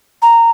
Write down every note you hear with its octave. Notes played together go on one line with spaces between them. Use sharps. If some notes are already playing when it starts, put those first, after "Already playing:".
A#5